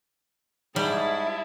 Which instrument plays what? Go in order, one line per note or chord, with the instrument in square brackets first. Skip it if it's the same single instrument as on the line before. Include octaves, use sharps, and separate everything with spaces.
[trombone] G#2 [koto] G3 [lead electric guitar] E4 [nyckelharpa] G#4 A5